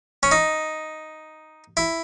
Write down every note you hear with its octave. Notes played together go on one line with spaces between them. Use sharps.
C#4
D#4
E4